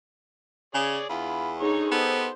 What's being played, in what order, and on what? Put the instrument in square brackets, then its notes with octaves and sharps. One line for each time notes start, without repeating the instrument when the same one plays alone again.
[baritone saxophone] C#3 [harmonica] G#4 C#5 D5
[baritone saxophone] E2 [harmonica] F4 B5
[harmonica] D3 C#6 [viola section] D#4 G#4 C#5
[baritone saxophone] B3 [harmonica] G4 A4 D#5 [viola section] C5